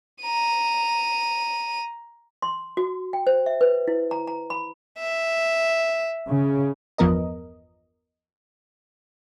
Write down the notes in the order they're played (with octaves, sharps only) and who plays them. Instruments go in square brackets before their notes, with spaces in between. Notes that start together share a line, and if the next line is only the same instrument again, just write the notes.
[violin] A#5 D#7
[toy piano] C6
F#4
G5
C5
E5
B4
E4
A#5
A#5
B5
[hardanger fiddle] E5
[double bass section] C#3
[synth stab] G1 E2 F3 B3 A#4 D#5